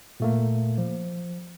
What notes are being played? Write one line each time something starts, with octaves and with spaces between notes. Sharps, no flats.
A#2 A3 A#3
F3